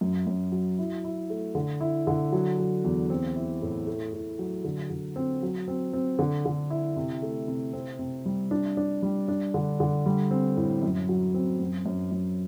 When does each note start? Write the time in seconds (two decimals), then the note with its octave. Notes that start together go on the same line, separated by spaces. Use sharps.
0.01 F#2
0.27 F#2
0.52 F#3
0.79 E4
1.04 E4
1.30 A3
1.55 D3
1.81 E4
2.07 D3
2.32 F#3
2.58 F#3
2.85 E2
3.10 C4
3.36 E4
3.62 A2
3.87 A3
4.13 A2
4.39 F#3
4.64 D3
4.90 D3
5.16 C4
5.42 F#3
5.68 C4
5.93 C4
6.19 D3
6.46 D3
6.70 E4
6.96 C3
7.22 A3
7.48 C3
7.73 C4
7.99 C3
8.25 G3
8.51 D4
8.77 D4
9.02 G3
9.28 D4
9.54 D3
9.80 D3
10.06 G3
10.31 C4
10.57 A2
10.83 F#2
11.09 F#3
11.34 C4
11.60 F#2
11.86 F#2
12.12 F#2